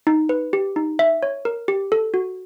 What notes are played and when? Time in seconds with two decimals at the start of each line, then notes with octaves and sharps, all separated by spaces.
0.07 D#4
0.29 B4
0.53 G4
0.76 D#4
0.99 E5
1.23 C#5
1.45 A#4
1.68 G4
1.92 A4
2.14 F#4